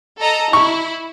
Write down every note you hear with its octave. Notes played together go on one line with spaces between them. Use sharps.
A4 D#5 A#5
E4 C#6